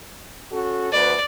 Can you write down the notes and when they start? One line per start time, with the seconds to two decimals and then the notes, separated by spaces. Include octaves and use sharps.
0.52 C#4 F#4 A4
0.92 D2 B4 D5